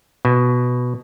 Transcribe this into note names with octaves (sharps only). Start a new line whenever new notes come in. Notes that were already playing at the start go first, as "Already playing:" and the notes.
B2